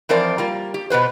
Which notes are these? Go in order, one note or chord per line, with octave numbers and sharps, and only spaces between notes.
E3 F3 C4 A#4 C5 D5
G3 A#3 F4
G4
B2 B3 B4 C5